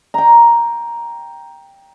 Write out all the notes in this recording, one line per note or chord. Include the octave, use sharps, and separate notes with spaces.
G5 A#5